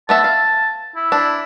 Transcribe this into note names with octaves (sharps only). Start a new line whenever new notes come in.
A3 B3 E5 A5
F5
E4
D4